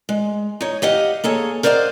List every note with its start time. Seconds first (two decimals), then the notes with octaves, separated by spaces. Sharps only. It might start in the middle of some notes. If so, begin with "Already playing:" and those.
0.09 G#3
0.61 D#4 C#5
0.82 G4 D#5 F5 F#5
1.24 A#3 G#4 A4 C#5
1.63 A#4 C5 D5 D#5 F5 F#5